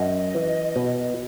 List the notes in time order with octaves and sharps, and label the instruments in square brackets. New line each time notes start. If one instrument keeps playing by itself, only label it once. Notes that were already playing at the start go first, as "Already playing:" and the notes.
Already playing: [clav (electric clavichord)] F#2 [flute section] D#5
[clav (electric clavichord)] E3
B2